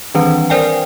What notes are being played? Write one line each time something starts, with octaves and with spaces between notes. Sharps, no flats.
D#3 E3 G3 C4 D4 B4
A#4 C5 D5 F5 G5 G#5